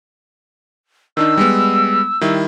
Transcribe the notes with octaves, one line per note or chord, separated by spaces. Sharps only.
D#3 D4 D#4 E6
G3 G#3 B3
D#3 G3 E4